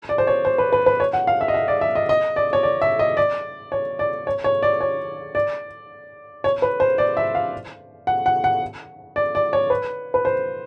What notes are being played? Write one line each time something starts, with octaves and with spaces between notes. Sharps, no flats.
D5
C5
C#5
C5
B4
B4
B4
C#5
F#5
F5
E5
D#5
E5
D5
E5
D#5
D#5
D5
C#5
D5
E5
D#5
D5
C#5
D5
C#5
C#5
D5
C#5
D5
C#5
B4
C5
D5
E5
F5
F#5
F#5
F#5
D5
D5
C#5
B4
B4
C5